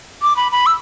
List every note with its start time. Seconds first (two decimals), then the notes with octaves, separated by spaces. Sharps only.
0.22 D6
0.36 B5
0.52 B5
0.66 E6